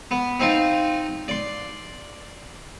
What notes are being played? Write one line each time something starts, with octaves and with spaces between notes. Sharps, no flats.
B3
C4 D#4 F4
D5 C6